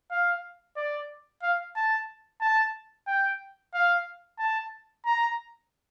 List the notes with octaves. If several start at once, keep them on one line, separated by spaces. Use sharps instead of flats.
F5
D5
F5
A5
A5
G5
F5
A5
A#5